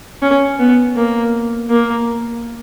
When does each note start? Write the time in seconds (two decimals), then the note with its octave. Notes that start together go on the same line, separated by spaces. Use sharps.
0.22 C#4
0.59 B3
0.97 A#3
1.70 A#3